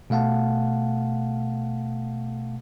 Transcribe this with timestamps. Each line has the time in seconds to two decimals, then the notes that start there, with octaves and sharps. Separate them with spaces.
0.10 B2 A3 F5 F#5 A5